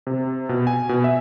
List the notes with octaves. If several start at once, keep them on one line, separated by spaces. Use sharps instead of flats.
C3
B2
G#5
B2
E5